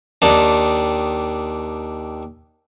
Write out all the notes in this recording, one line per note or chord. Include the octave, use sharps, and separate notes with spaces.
D#2 D#3 D4